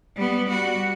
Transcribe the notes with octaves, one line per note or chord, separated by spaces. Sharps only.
G3 B3
G3 F#4